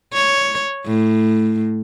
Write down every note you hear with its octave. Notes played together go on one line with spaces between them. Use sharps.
C#5
A2